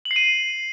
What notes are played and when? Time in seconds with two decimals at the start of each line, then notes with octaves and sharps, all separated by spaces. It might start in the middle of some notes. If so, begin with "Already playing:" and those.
0.05 F#7
0.11 C7
0.16 D#7